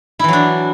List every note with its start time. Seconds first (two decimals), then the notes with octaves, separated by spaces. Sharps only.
0.19 E4
0.24 E3
0.28 F#3
0.33 D4